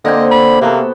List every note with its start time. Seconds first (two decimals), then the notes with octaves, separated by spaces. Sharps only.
0.05 D3 A#3 C4 D#5 G5
0.31 B5
0.61 C3 A#3 B3 F#4 A4